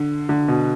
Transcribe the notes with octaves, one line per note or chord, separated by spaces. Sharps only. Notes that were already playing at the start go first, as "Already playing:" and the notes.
Already playing: D3
D3
B2